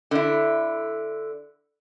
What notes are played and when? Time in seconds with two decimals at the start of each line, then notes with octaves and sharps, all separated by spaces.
0.11 D3 E4